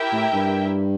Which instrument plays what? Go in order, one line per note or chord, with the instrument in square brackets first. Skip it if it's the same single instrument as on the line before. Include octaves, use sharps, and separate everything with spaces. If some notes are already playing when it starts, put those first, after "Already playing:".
Already playing: [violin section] E4 G4 A#4 E5 G5
[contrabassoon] A2
G2